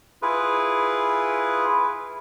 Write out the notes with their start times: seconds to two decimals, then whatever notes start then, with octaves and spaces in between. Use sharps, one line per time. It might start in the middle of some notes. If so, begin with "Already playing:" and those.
0.22 E4 F4 G#4 B4